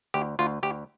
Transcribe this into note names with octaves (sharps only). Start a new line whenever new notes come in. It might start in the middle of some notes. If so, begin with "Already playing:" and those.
D2 G4
D2 F4
D2 G4